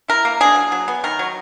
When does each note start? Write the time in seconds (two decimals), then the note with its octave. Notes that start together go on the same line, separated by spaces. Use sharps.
0.08 E4 A#4
0.25 A#3
0.40 D4 G#4
0.56 F#3
0.72 F#3
0.88 B3
1.04 D#3 A#4
1.19 F#3